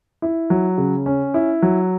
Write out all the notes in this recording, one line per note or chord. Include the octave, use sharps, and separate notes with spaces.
E4
F#3
C#3
C#4
E4
F#3